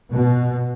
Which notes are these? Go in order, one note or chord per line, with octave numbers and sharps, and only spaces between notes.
B2